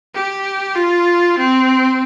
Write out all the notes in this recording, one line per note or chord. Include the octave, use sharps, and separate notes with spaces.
G4
F4
C4